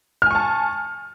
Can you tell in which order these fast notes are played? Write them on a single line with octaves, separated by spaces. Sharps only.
F6 G#5 C#6 A5